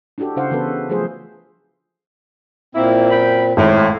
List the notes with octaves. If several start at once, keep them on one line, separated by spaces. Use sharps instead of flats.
D4 E4 F#4 G4 A4
C#3 D4 E4 C5 F5 F#5
C#3 E3 B3 F#4 A4 B4
F3 F#3 A3 F4 G#4 C5
A#2 A#3 C4 E4
F#2 G5 B5
G#1 A2